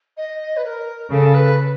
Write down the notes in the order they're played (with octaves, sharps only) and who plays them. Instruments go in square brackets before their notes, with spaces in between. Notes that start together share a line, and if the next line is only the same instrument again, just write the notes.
[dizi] D#5
B4
A#4
[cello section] C#3 [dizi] A4
[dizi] B4